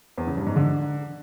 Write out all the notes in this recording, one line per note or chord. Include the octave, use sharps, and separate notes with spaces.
E2
C#3
G2
G#2
D3